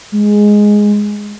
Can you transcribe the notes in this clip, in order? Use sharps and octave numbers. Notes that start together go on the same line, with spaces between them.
G#3